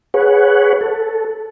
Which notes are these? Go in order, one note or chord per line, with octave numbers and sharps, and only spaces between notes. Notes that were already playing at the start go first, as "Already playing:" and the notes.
G#4 B4 C#5 F#5
A4